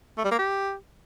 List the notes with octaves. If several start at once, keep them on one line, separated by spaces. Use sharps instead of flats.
A3
G3
A#3
G4